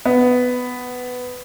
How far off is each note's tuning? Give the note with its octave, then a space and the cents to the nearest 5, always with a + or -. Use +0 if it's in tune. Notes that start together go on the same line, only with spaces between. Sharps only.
B3 +10